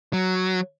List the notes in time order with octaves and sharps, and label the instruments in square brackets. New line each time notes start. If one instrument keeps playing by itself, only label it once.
[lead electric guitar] F#3